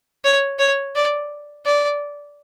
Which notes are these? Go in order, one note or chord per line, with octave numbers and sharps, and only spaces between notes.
C#5
C#5
D5
D5